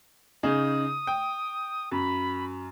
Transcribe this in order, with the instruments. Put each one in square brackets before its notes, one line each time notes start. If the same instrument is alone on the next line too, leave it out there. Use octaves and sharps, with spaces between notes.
[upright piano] C#3 D#4 G#4 [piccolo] D#6
[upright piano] G5
[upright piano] F#2 [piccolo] B5